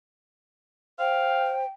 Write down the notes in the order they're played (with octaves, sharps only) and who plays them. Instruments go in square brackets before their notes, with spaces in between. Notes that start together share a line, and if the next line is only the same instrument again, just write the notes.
[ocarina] C5 [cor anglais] F5 [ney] G5